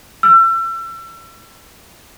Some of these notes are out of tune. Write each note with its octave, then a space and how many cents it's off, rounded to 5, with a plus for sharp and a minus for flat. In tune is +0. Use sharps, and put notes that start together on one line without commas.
E6 +35